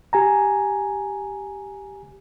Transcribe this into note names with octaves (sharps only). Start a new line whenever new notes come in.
G4 G#5 A#5